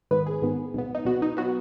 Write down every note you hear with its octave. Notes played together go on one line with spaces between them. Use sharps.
G#2 D#3 B3 B4
G#4
G#2 D#3 B3
B1 B2 B3
D#4
B1 B2 B3 F#4
D#4
F#3 B3 F#4